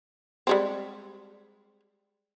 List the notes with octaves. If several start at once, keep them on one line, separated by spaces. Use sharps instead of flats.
G3 G#3 C4